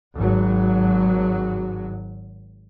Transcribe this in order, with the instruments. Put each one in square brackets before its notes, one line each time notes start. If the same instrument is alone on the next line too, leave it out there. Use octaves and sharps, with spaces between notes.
[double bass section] G#1 F#3